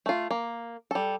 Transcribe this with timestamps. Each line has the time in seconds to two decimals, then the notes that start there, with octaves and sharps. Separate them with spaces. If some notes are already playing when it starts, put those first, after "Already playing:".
0.06 A3 F4
0.31 A#3
0.91 G3 A4